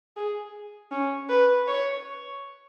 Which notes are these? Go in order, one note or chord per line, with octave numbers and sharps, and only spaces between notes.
G#4
C#4
B4
C#5